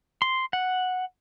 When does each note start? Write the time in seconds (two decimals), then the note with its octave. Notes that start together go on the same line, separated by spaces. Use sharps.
0.22 C6
0.53 F#5